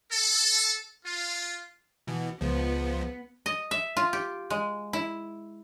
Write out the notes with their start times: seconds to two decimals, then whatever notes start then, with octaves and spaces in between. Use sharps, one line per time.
0.12 A4
1.05 F4
2.07 B2 E3
2.41 C#2 F3 B3
3.46 D#5
3.71 E5
3.97 F4
4.13 G4
4.50 G#3
4.93 E4